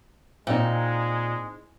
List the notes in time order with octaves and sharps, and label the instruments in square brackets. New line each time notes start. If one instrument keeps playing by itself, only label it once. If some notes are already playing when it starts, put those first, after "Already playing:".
[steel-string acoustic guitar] A#2 [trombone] G#3 [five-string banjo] C4 D#4